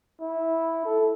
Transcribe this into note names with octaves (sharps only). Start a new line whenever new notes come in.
E4
A4